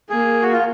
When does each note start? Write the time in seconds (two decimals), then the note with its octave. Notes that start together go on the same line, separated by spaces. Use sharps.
0.10 A#3 G#4
0.42 F#4
0.53 F4